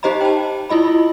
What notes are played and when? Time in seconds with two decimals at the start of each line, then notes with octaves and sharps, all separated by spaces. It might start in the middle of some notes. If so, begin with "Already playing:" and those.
0.03 D#4 G4 C5 D#5 A#5 B5
0.21 G5 A5
0.69 E4 F4 D#5 B5